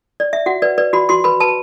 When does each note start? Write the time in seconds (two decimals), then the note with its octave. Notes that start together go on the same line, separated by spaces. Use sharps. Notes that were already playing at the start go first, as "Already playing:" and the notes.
0.20 D5
0.33 E5
0.46 F#4 F#5
0.62 B4 D5
0.78 B4 D5
0.93 F#4 B5
1.09 F#4 C6
1.24 B4 B5
1.40 B4 A5